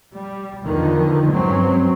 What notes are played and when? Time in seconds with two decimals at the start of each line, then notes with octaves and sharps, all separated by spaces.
0.12 G3
0.64 E2 D3 D#3 F3
1.31 G2 F#3 G#3 C4 C#4